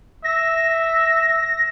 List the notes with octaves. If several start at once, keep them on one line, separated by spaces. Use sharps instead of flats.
E5 A#6